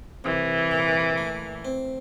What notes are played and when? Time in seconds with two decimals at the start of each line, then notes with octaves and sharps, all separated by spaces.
0.24 C2 E3
0.71 A#2
1.18 A3
1.65 C4